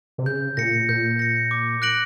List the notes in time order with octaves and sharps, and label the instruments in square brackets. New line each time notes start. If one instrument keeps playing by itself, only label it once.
[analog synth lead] C3
[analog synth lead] C#3 [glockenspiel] G6
[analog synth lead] A#2 [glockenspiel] A#6 C#7
[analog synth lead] A#2 [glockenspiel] G6
[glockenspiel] A#6 C#7
D6
F#6 A#6 D7 F#7